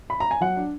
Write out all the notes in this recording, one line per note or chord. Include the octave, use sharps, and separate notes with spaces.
B5
A#5
G#5
F#3 F#5
D4